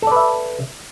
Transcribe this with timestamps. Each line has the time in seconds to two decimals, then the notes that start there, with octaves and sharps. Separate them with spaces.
0.02 A4
0.07 D5
0.12 B4
0.16 E5